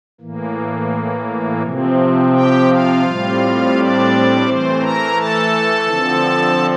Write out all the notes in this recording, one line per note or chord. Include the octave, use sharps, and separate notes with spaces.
A2 E3 A#3
C3 F3 C4
G4 G5
F4 F5
A2 G3 C4
D4 D5
E3 A3 C4 C5
A#4 A#5
A4 A5
D3 F3 C4